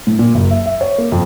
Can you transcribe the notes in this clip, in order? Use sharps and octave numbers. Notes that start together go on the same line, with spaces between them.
A2
A#2
F#1
E5
E5
C#5
A#3
F2